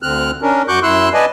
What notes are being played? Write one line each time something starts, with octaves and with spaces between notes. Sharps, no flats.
D2 D3 C4 F6 F#6
C#4 D4 A#4
F#2 F#4 C#6 D6 F#6 G6
F#2 E4 C6 E6 F#6
B4 D5 D#5 G#5 A5